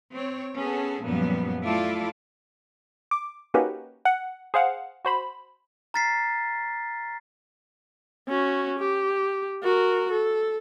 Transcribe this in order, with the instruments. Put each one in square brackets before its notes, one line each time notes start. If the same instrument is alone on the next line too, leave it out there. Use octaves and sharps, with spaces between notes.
[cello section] C4 C#5
B3 C#4 G#4 A4
F#2 A#2 F3 G3 B3
A3 E4 F4 A4 D5
[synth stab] D6
A#3 C#4 D#4 F#4 G4 B4
F#5
G#4 C5 F5 F#5
F#4 C5 B5
[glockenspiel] A#5 F6 A6 B6 C7
[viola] C#4 F#4
G4
F#4 A#4
A4